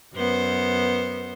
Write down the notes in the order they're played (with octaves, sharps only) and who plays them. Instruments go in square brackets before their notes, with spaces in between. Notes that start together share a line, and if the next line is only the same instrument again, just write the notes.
[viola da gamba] F#2 B3 C5